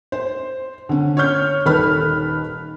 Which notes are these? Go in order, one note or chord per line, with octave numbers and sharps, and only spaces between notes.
C5
D3 C#4
C#5 C#6 F6 G6
D#1 D#3 A4 B4 B5 F6